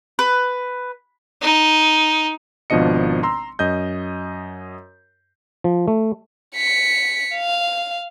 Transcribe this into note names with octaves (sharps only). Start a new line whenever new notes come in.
B4
D#4
G#1 B2 F3 D4 D#5 C#7
A#5 C6 E6
F#2 D#5 G6
F3
A3
B6 C#7
F5